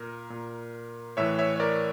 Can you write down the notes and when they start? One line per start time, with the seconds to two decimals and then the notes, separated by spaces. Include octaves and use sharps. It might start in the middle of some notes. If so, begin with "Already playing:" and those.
Already playing: A#2 A#4
0.30 A#2
1.17 A2 E3 C#5 E5
1.38 C#5 E5
1.56 C#5
1.60 A#4 D5